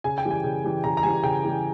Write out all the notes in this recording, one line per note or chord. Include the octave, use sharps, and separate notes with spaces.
C#3 G#5
G5
E3 G3
G#5
C#3
E3 G3
C#3 A#5
A#5
E3 G3 G#5
C#3 G5
E3 G3